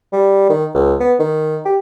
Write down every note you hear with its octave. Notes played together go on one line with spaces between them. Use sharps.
G3
D#3
C#2
B3
D#3
G4